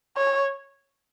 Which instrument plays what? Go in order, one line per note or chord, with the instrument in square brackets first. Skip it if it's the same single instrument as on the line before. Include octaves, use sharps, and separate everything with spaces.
[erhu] C#5